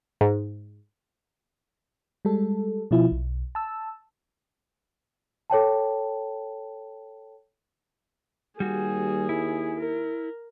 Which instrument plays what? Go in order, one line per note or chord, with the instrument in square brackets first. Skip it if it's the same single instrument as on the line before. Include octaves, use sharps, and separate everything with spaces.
[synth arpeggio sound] G#2
[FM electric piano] G3 G#3 A4
B2 F3 E4 F4
B1
A5 E6
[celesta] A4 C#5 G5 A5
[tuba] D#2 [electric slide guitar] G3 F#4 [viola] G#4
[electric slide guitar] E4
[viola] A#4